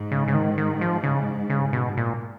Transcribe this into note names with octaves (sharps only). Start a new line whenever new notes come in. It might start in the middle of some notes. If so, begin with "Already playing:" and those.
Already playing: G#2
C#3
C#3
D#3
D#3
F3
C#3
C#3
B2
A#2